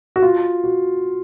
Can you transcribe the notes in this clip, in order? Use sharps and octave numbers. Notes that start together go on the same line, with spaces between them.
F#4
F4
F#4